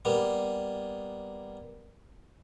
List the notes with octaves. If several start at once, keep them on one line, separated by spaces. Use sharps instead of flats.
G3 A#3 B3